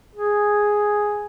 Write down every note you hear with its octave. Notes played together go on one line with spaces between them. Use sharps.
G#4